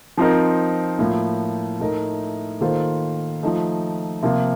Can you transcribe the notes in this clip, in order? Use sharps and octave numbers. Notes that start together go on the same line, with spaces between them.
F3 C4 D#4 A#4
A2 F3 A#3
A2 A3 D#4 A#4
D#3 A#3 F4 A4 C5
F3 A3 D#4
C3 F3 A#3 F4